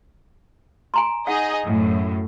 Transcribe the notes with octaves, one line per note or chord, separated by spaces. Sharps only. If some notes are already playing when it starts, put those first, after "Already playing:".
G#5 A#5 C6
D#4 G#4 D#5 F#5
F#2 A2